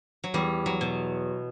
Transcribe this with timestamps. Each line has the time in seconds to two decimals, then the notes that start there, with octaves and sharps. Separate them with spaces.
0.24 F#3
0.34 E2 G3
0.66 F#3
0.81 B2